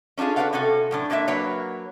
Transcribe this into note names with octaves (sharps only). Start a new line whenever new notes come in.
C#4 D4 E4 F4 G#4
F#4 B4 C5 D5 F5 F#5
C3 C#4 F#4 A4
F#2 A2 D4
G#2 A#3 D4 G#4 E5
F#3 A#3 B4 C#5